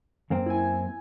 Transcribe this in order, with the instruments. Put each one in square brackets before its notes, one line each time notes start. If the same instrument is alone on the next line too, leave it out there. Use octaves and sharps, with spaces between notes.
[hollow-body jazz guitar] F#2 A#3 C4
[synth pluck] E4 G#5